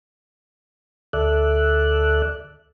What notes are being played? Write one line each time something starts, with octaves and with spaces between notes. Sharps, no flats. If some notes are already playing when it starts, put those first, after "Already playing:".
D2 A4 D5 E5 F#6